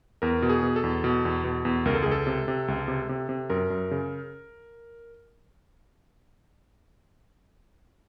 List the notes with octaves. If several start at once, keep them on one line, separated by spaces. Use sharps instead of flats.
E2 A#4
B2
G#4
B2
A4
E2
B2
E2
B2
E2
C#2 A#4
A4
C#2 G#4
A4
C3
C3
C#2
C3
C3
C3
F#2 A#4
F#2
C#3